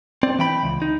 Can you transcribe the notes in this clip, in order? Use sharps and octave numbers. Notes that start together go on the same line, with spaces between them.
C4 D5
E3 G5 B5
C#2
D#4